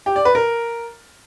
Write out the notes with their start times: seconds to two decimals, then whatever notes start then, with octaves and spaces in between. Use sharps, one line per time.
0.06 G4
0.16 D5
0.25 B4
0.35 A#4